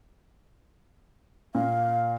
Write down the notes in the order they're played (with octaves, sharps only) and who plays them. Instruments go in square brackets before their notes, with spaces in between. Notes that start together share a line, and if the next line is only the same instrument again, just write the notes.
[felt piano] A#2 [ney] F5